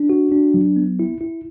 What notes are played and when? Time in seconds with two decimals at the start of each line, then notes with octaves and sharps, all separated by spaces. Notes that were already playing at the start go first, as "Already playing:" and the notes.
Already playing: D4
0.10 F#4
0.32 D4
0.54 F#3
0.76 B3
0.99 E4
1.21 E4